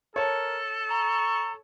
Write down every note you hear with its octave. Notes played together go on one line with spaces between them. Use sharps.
A4 A#4 C#5 A5
A#5 C#6